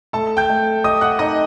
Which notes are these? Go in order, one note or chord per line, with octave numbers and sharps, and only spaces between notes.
A3 A4 A5
G5 G6
A3
G4 D#5 D#6
F#5 F#6
D#4 D#5 D#6